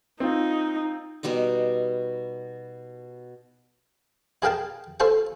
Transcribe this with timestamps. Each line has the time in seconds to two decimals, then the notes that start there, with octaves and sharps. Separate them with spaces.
0.20 C4 D#4 F4
1.23 B2 G3 D#4 D#5
4.42 E4 G#4 A#4 F5 G5 A5
5.00 F4 A4 C5 A5 C#6